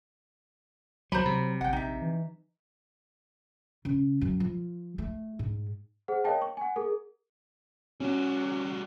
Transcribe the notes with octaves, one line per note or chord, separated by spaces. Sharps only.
C#2 F#3 C5 A#5 B5
C3 F#3
G1 F#5 G5
A#1 D#4 E5
E3
C#3
F#2
F3
A3
G#2
G#4 C5 F#5
A#4 C#5 D#5 F5 G5 A5
C#6
F#5 G#5
G#4 A#4
G3 C#4 F#4